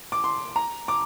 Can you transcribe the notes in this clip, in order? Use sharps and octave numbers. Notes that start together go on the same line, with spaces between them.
D6
C6
A#5
D6